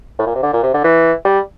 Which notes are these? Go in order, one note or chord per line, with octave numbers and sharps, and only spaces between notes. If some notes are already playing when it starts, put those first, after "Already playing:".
A2
A#2
C3
D3
A#2
C3
D3
E3
G3